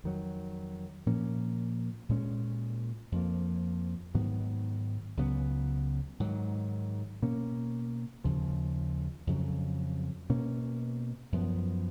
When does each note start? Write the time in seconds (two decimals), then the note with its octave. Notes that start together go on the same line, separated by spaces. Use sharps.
0.04 F2 D#3 F#3
1.06 A#2 F3 A#3 C#4
2.09 A#2 G#3 C#4
3.12 F2 F3 A#3
4.14 G#2 D#3 F#3 B3
5.17 C#2 C#3 F#3 B3
6.20 G#2 D#3 F#3
7.22 B2 A#3 C#4
8.24 D#2 C#3 F3
9.27 F2 C#3 F#3
10.29 B2 A#3 C#4
11.32 F#2 F3 B3